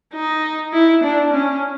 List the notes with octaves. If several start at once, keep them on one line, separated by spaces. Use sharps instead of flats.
D#4
E4
D4
C#4